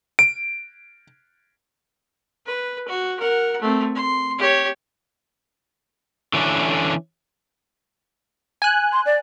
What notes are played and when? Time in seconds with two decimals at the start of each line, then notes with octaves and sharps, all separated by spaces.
0.19 D7
2.46 B4
2.88 F#4
3.20 A#4 F#5
3.61 A3 C4
3.95 C6
4.38 G4 C#5
6.33 D3 E3 C#4 D4
8.62 G#5 F#6
8.92 C6
9.06 D5